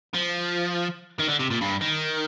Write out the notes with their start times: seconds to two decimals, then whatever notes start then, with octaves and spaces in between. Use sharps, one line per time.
0.14 F3
1.19 D#3
1.29 D3
1.39 C3
1.50 A#2
1.61 G2
1.81 D#3